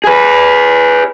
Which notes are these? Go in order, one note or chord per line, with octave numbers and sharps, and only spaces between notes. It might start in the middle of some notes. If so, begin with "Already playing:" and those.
G#4 B4